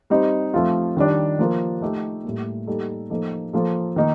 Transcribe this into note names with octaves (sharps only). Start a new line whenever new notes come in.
G3 C4 D#4
F3 A3 C4 F4
D#3 G3 D4
F3 A#3 F4 A#4
A3 D#4 G4
A2 G3 A#3
G3 A#3 D#4 A4
F3 A#3 D#4 A4
F3 A#3 F4 A4
D#3 A#3 D#4